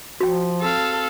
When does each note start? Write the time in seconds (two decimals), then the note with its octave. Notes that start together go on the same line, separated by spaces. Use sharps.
0.21 F3 F#4 G5
0.61 C4 A4 F5